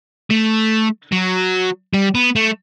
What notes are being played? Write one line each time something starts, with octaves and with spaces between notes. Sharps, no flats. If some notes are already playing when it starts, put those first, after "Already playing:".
A3
F#3
G3
B3
A3